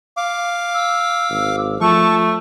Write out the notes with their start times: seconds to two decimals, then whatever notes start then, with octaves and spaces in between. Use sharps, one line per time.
0.17 F5 D6
0.74 E6
1.30 G#1
1.81 F3 A3 A5 C#6